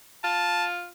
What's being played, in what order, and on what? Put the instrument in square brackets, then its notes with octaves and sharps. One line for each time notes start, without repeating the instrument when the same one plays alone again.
[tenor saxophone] F4 [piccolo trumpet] A5